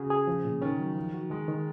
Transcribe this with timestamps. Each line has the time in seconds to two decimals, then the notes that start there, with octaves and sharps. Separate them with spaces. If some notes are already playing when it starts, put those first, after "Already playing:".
Already playing: C#3 F#4 G#4
0.10 G#4
0.27 F3
0.44 A#2
0.62 D#3 C#4
0.80 F#3
0.96 F3
1.14 F#4
1.30 D#3 G#3
1.48 D#3